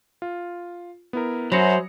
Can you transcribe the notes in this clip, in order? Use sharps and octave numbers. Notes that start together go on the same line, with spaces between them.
F4
B3 E4 A#4
F#2 F#3 C5 B5 A#6 C#7